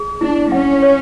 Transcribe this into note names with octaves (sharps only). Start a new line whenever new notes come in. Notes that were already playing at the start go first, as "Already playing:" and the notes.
Already playing: G#4
D4 E4
C#4 F#5
C#5